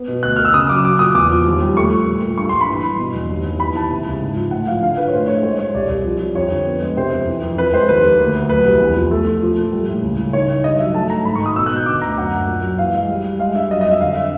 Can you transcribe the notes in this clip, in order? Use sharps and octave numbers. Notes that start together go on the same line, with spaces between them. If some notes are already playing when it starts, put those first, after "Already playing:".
Already playing: B3
B2
D2 F#6
A#3 F6
E6
C#3 D#6
F#3 D6
F#3 D6
A#2 D#6
E2 D6
F3
D#2
G3
A3 C#6
F3
A#2
A#2
G2 C#6
G2 C6
B5
E3 C6
G2
B2
E2
D#2
D#2
E3 B5
E3 A5
C3
C#2
G#2
F3
A2 F#5
F3 F5
D3 F5
D3 B4
C#5
A2 C5
A3 C#5
G#3 C5
G#3 C#5
C2 D5
C2
F3
F3
F2 C#5
D3
B3
G#3
C3 C5
F2
E3
F2
F2 B4
G#3 C5
D#2 B4
A#3
D2
D2
F#3 B4
C2
E2
F3
A3
A3
F3
A#2
G3
A2
C#2
C#2
D#3 C#5
D#3
G2 D#5
F#3 E5
A3 A5
A3 A#5
G#2 B5
C#6
D#3
D#6
B2 E6
F#6
B2
G6
D3 D6
D2 A#5
F#2 F#5
F#2
A#2
F#3
E3 F5
G#3
G3
G3
G#3 F5
G2 E5
F#3 D#5
D#5
F2
E5
D3 F5
E5